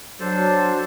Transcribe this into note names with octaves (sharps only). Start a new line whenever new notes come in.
F#3 D4 A4 C5